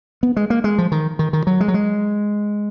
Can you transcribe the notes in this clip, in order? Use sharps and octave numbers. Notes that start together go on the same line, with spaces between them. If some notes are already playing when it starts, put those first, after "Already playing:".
B3
G#3
A#3
G#3
F3
D#3
D#3
D#3
F#3
G#3
F#3
G#3